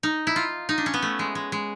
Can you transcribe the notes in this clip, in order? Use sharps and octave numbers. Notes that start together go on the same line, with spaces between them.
D#4
E4
F4
D#4
D4
C#4
B3
A3
G#3
G#3
G#3